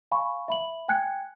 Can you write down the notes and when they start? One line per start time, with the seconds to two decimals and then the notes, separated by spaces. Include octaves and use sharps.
0.12 F5 G#5 B5 C#6
0.48 E5 B5 F#7
0.88 G5 G#5 F#6 G#6 C#7